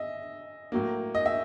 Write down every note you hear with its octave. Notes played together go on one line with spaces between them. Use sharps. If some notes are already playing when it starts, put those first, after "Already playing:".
Already playing: D#5 E5
A2 F#3 A#3
D#5
E5